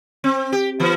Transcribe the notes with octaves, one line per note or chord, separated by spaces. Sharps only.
C4
G4
E3 B3